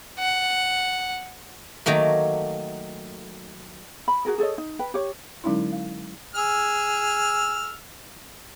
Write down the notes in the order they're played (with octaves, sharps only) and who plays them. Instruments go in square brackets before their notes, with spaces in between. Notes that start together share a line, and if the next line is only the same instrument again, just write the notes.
[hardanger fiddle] F#5
[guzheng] D#3 F#3 A3 A#3
[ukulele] B5
F#4 G#4 A#4
G#4 A4 C#5 D#5
D#4
B4 G5
G4 C#5
[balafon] D3 F#3 G#3 C#4 D#4 E4
F5
[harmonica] G#4 E6 F6